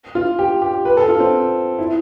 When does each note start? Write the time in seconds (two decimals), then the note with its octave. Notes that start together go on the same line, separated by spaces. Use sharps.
0.15 F4
0.39 G4
0.62 G4
0.85 B4
0.97 A4
1.09 F4
1.20 C4
1.78 E4